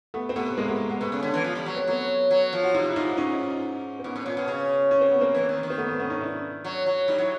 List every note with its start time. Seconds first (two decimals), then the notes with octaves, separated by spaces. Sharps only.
0.14 A3 B3
0.29 C4
0.36 C3 A3 B3
0.58 G#3 A#3
0.69 A3 B3
0.90 A3 B3
1.01 C3 A3 B3
1.12 C#3
1.23 D3
1.34 E3
1.44 F3
1.55 G3
1.66 F#3
1.77 C4
1.88 F#3 A3 B3
2.31 F#3
2.53 F3
2.63 F#4
2.74 C3 D#4 F4
2.89 E4
2.96 G#2 D#4 F4
3.17 C#4 D#4
3.99 C4
4.04 G#2 B3 C#4
4.16 A2
4.26 A#2
4.37 B2
4.48 C#3
4.91 C#4
5.01 C4
5.11 B3
5.21 A#3 C4
5.35 E3
5.49 D#3
5.63 D#3
5.70 C4
5.78 A3 B3
5.88 A3 B3
5.99 B3 C#4
6.10 C#4 D#4
6.21 D4 E4
6.64 F#3
6.86 F#3
7.08 G3 D#4
7.18 F#3 E4